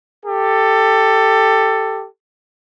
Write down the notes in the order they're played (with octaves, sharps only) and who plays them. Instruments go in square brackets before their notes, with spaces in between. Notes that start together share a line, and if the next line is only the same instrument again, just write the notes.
[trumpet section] G4 A4